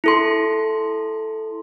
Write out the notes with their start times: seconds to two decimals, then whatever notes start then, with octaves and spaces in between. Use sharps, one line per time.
0.04 E4 A4 C6